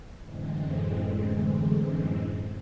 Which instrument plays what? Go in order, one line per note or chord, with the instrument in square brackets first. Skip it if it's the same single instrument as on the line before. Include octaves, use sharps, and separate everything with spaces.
[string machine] F#2 A2 D3 E3 G#3 C4